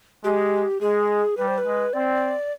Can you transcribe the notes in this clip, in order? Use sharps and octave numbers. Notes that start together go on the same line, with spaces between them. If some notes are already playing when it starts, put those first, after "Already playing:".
G#3 G4
G#3 G#4
G3 B4
C5
B4
G#3
C4 D5